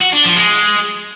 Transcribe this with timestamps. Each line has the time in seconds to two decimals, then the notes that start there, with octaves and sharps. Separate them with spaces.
0.01 F#4
0.12 D4
0.24 F3
0.36 G#3